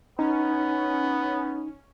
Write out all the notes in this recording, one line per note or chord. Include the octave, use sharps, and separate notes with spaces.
B3 C#4 D#4